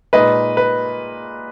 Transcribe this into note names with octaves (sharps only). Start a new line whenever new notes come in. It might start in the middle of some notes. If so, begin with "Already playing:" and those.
A#2 G#3 D#4 B4 D#5
B4